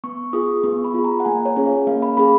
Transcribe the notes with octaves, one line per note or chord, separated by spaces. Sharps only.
B3 C#6
F4 G#4 D#6
B3 C#6
B5
F4 G#4
A#5
F#5
A#3 G#5
C#5
C#4 G#4
F5
A#3 F5
B5
C#4 G#4 B5